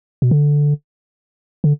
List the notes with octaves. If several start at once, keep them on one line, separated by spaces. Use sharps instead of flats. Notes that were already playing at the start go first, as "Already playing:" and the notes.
B2
D3
D3